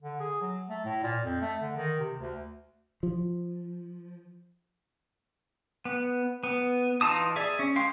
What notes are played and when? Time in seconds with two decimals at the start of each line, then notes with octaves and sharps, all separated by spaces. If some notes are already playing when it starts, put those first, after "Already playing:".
0.02 D3
0.20 G#4
0.41 F#3
0.70 A3
0.85 A2
1.03 A#2
1.23 F2
1.41 A3
1.61 D3
1.77 D#3
2.00 C3
2.19 D2
3.03 F3
5.85 B3
6.43 B3
7.01 E3 D#4 F4 A5 D#6
7.36 G#4 D5 E5
7.59 C#4
7.76 G#3 F5 G5 C6